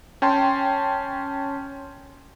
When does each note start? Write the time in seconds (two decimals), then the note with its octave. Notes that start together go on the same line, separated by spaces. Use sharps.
0.22 C#4 G5 A5 C6